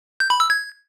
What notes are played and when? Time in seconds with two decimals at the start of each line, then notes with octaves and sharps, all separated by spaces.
0.20 G6
0.30 B5
0.40 E6
0.50 G#6